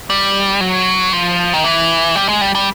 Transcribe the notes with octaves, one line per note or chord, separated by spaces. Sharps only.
G3
F#3
F3
D#3
E3
G3
G#3
G3
G3